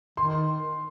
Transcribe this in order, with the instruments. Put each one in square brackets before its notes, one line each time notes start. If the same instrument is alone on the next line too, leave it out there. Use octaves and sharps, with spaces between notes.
[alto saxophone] D#3 [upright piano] C6